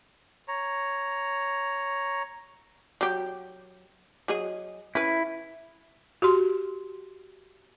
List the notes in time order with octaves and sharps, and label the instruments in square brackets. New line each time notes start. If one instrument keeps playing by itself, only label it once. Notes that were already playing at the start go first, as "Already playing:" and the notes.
[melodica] C#5 A#5
[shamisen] F#3 G4
F#3 G#4 D#5
[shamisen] C#4 B4 [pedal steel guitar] E4
[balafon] F#4 G4 C6